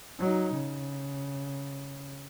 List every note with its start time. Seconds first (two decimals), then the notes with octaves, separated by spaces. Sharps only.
0.19 F#3 D#4
0.53 C#3